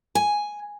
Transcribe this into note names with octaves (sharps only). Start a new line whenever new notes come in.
G#5